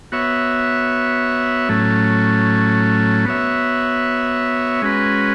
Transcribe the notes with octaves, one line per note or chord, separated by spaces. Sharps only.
B3 F#4 C#5 E5
A2 F#3 A3 C#4
B3 F#4 C#5 E5
G#3 C#4 F#4 B4